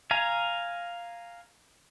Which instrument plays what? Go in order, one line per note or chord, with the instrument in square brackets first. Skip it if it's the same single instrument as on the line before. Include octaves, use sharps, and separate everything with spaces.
[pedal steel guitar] F5 G#5 A#5